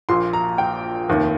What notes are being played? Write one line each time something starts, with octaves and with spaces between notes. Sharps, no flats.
A#1 A#2 C6
A#5
G5
F1 D#2 D#3